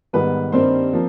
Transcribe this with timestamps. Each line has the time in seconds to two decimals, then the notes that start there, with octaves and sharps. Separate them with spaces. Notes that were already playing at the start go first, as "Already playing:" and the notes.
0.13 G#2 D#3 G3 B3 B4
0.52 G2 D#3 G3 A#3 C4 C5
0.93 F3 A#3